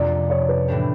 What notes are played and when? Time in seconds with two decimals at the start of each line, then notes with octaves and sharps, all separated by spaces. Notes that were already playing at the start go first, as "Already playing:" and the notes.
Already playing: F2 C3 F3 A#3 D4 D5
0.30 C#5
0.49 B4
0.68 A2 E3 A3 D4 G4